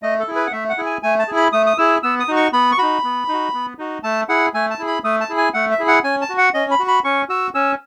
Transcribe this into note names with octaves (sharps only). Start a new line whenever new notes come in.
A3 D#5
A4
E4 G#4
B4
F#5
A3 E5
F#5
E4 G#4
G#5
A3 G#5
A5
E4 G#4
B5
A3 D#6
D#6
E4 G#4 E6
B3 E6
D#6
D#4 F#4
C#6
B3 B5
C#6
D#4 F#4 B5
B3
D#4 F#4
B3
D#4 F#4
A3 A5
E4 G#4 F#5
A3 G#5
A5
E4 G#4
B5
A3 D#6
A5
E4 G#4
G#5
A3 F#5
E5
E4 G#4
F#5
C#4 G#5
A5
F#4
F#5
C#4 D#5
B5
F#4
B5
C#4 C#6
F#4 E6
C#4 E6